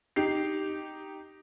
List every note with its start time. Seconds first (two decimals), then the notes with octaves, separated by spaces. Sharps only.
0.16 D#4 G4 C7